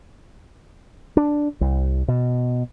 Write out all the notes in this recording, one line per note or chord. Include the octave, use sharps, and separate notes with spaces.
D4
C2
B2